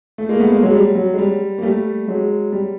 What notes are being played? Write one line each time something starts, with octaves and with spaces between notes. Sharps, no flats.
A3
G#3 A#3
A3 B3
G#3 A#3
F#3 G#3
G3
F#3
G#3
G3
A#3
G3 A3
F#3 G#3
G3